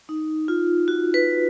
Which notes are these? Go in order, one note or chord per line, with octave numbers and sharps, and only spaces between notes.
D#4
F4
F#4
B4